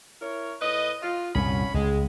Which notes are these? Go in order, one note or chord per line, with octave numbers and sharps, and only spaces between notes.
E4 A#4 C#5
A2 B4 D#5
F4
C2 F#2 A#2 C#4 B5
C#2 G#3